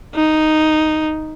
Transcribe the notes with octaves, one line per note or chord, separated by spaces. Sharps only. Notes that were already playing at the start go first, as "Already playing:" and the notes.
D#4